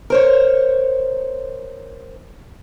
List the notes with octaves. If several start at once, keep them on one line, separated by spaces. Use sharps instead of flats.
A#4 C5 C#5